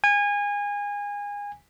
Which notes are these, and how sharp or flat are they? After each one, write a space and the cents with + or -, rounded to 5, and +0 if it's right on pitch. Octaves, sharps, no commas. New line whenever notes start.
G#5 -25